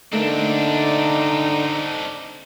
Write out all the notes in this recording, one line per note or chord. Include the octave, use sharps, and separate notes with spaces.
D3 A3 A#3 C4 D4 D#4